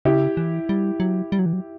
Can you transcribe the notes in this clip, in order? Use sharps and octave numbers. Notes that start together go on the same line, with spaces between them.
C#3 E4 G4
E3
G3
F#3
G3
F#3
E3
F#3